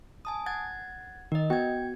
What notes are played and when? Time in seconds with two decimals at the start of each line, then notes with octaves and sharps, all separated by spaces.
0.25 G#5 A5 D#6
0.46 F#5 G#6 A6
1.32 D#3 A#4 D#5
1.50 B3 F#4 G5 G#6